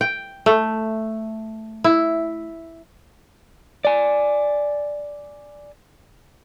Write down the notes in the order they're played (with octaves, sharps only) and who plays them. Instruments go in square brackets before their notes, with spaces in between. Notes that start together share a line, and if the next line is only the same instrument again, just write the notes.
[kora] G5
A3
E4
[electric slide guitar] D5 G#5